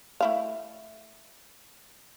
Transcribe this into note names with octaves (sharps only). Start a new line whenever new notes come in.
A3 E4 F5